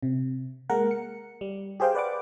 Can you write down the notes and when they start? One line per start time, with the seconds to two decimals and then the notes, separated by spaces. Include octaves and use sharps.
0.03 C3
0.69 G#3 A#3 A#4 F#5
0.91 C#7
1.41 G3
1.80 G4 G#4 C5 F5 G5
1.95 B4 D5 F#5 D6